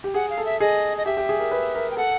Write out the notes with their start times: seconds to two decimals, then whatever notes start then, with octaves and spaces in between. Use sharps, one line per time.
0.04 G4
0.14 G#4 F#5
0.30 F5
0.38 A4
0.45 E5
0.60 G#4 D#5
0.97 D#5
1.06 G4 E5
1.17 G4
1.29 G#4
1.40 A#4
1.52 B4
1.75 A#4
1.91 G5
1.97 A4 F#5